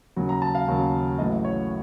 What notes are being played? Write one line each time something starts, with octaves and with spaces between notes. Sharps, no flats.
D#2 C#3 F#3
A#5
A5
F5
D#2 C#3 F#3
A1 A2 F#3 D#5
C#5